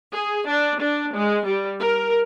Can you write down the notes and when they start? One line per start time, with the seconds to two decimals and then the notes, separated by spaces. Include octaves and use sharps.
0.13 G#4
0.48 D4
0.80 D4
1.15 G#3
1.46 G3
1.80 A#4